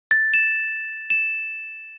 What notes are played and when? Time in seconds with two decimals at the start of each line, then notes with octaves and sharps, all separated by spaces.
0.11 A6
0.34 E7
1.10 E7